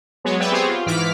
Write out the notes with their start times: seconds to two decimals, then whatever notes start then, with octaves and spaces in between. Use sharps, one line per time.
0.24 F#3 G#3 B3 C#5
0.39 B4 C#5 D5 E5 G5
0.51 B3 C4 G4 G#4 C5 C#5
0.68 F4
0.86 G#2 E3 D6 F6 B6